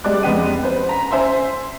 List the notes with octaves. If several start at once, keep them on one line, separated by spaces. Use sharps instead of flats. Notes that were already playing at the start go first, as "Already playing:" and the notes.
G3 G#3 D5 D6 F#6
F1 G#3 B3 G4 D#7
B4 C5
A#5 B6
C5 E5 G#5 C6